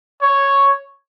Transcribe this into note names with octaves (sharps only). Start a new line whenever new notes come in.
C#5